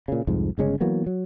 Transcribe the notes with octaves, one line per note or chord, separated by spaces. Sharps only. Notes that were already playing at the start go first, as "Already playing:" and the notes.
A#2 C#3
C2 F2 G#2
G1 C#3 G#3 C#4
E3 F#3 A#3 B3
F#3